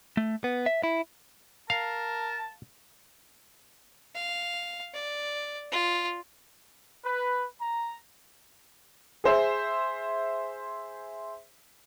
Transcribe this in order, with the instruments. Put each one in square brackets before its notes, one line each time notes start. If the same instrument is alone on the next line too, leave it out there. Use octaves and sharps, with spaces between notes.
[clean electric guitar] A3
B3
E5
E4
[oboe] A#4 [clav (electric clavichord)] F5 [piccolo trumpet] A5
[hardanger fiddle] F5
D5
F4
[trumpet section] B4
A#5
[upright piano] G#4 C5 E5